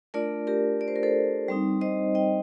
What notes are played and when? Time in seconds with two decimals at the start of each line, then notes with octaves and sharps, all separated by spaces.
0.14 A3 D4 F4 A#4 D5
0.47 G4 A#4
0.81 D5
0.88 C5
0.96 A#4
1.03 A4 C5
1.48 G3 C4 D#4
1.81 C5 D#5
2.15 D#5 G5